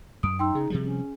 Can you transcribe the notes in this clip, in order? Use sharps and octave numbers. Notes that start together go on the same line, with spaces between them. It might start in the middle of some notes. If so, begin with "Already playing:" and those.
F#2 D#6 D7
D#4 G5 C6 E6
C#3 G#4
C3 F3 G3
C#4